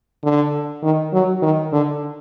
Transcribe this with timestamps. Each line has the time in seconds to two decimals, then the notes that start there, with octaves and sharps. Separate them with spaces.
0.24 D3
0.83 D#3
1.13 F#3
1.42 D#3
1.72 D3